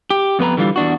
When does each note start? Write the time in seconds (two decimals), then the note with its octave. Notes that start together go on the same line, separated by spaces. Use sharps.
0.10 G4
0.39 F2 B3 B4 A#5
0.57 D3 E3 G3 F4
0.76 E2 D4 F#4